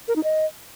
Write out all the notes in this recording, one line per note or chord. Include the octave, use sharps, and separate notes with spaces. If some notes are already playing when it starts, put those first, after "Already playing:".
A#4
D#4
D#5